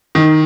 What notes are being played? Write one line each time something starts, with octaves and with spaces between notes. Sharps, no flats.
D#3